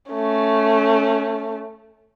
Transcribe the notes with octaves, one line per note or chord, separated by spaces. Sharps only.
A3 C#4